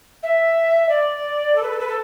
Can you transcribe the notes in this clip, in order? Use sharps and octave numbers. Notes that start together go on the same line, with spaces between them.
E5
D5
A4
B4
A4
B4
A4